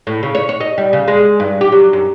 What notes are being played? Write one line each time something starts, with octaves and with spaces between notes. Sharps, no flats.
A2
C#3
C#5
C#5
D#5
G3
C#3
G#3
G2
G4
F#3
F#2